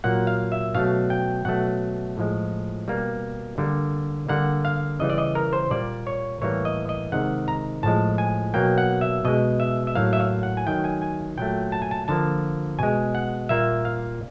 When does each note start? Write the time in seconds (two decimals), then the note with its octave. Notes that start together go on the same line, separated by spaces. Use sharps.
0.04 A#2 F#3 A#3 F#5
0.27 F5
0.52 E5
0.75 B2 F#3 A3 F5
1.10 G5
1.45 B2 F#3 A3 F#5
2.17 A2 F3 G#3
2.88 B2 G3 A#3
3.58 D3 G3 A#3
4.29 D3 G3 A#3 F#5
4.65 F5
5.00 C#3 E3 G3 D#5
5.10 D5
5.18 D#5
5.35 A#4
5.53 C5
5.71 A#2 G3 A#3 D5
6.07 C#5
6.41 A2 E3 G3 A#3 C#5
6.65 D#5
6.89 D#5
7.12 C3 D#3 G#3 F#5
7.48 A#5
7.83 A2 F3 G#3 A5
8.18 G#5
8.54 B2 F#3 A#3 G5
8.78 F#5
9.01 E5
9.25 B2 G#3 D#5
9.60 E5
9.87 E5
9.95 A2 F#3 A#3 F5
10.13 E5
10.20 F5
10.43 F#5
10.57 G#5
10.67 D#3 F#3 A3 G5
10.84 G#5
11.02 G#5
11.37 A#2 F#3 A3 G5
11.72 A5
11.82 G#5
11.91 A5
12.08 D3 F3 A#3 A5
12.79 B2 G#3 G#5
13.15 F#5
13.49 A#2 G3 A#3 E5
13.85 F5